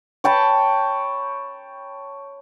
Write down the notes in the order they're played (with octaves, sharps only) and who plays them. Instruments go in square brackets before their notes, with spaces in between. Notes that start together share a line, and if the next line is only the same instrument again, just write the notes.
[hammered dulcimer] C#5 G5 A5 B5